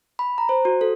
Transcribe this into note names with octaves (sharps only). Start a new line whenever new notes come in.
B5
A#5
C5
F#4
A4